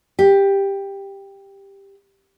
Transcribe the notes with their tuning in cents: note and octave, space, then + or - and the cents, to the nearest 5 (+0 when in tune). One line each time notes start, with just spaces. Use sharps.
G4 +10